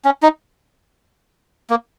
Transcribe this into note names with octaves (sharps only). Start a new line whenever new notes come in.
C#4
D#4
A#3